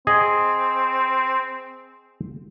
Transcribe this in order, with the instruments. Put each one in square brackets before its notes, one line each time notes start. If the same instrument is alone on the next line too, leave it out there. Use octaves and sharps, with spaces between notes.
[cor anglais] C4 [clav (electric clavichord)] G#4 D#5